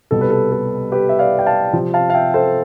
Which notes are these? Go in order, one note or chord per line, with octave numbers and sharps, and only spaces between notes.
C2 B2 G3 A4
B4
A4
A4
G4 B4
E5
D5 F5
G5
F5 A5
C3 F3 C4
F5 A5
F5
E5 G5
A4 C5